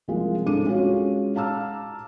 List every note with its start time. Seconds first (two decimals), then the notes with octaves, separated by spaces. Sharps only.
0.08 C2 F3 G#3 A#3
0.46 C2 G#2 D4 A4 D6 D#7
0.66 G#3 C#4 F4 F#4 C#5 F5
1.36 F5 A5 A#5 D6 E6 F6